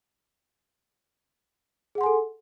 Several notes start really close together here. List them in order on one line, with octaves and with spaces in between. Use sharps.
G#4 F#5 C6 G#5 A4